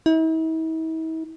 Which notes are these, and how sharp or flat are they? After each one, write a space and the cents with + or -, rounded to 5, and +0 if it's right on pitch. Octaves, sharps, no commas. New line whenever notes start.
E4 -45